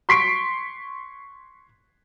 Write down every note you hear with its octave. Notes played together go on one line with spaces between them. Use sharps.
C6 C#6 B6 C7 D7